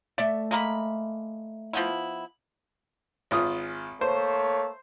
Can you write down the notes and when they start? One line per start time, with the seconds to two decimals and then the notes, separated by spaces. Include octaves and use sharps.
0.18 A3 D5 E5
0.51 G#3 A#3 B5
1.73 F3 B3 E4
3.31 G#1 F4 D#6
4.01 A3 A#3 C5 C#5